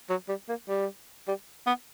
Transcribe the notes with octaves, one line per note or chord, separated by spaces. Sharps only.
F#3
G3
A#3
G3
G3
B3